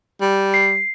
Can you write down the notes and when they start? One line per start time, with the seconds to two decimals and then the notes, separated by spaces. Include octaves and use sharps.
0.21 G3
0.54 C7